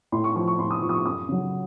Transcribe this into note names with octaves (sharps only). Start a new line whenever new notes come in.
A2 C6
C#6
F3 C#6
C#6
A2 C6
D#6
F3 C#6
D#6
C#6
F#2 D#6
C#3 F#3